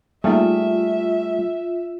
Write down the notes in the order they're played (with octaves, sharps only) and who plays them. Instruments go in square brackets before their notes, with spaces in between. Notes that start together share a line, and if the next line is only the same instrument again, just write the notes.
[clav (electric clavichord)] G3 A3 G#4 [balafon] A#3 D#4 [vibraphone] F4 [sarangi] E5